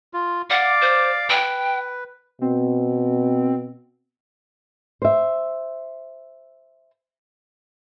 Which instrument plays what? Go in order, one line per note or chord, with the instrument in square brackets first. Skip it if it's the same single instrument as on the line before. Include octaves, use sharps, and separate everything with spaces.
[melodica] F4
[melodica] D5 F5 D6 [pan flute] F#5
[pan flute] C5
[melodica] B4 [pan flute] G5
[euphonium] B2 [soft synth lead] C4
[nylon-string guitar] C5 E5